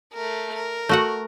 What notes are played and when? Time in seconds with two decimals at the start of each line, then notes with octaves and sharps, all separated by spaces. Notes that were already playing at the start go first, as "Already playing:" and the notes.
0.14 A3 A#4
0.55 A#4
0.89 A3 F#4 F#5